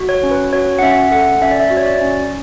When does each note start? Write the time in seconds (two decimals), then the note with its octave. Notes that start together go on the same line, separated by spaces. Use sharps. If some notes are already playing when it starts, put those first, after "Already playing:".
Already playing: F#4
0.09 C#5
0.23 C#4
0.31 B4
0.53 F#4 C#5
0.79 F#5
0.82 C#4 E5
1.12 A4 F#5
1.41 C#4 E5
1.51 D5
1.60 E5
1.71 F#4
1.77 C#5
1.86 D5
2.01 C#4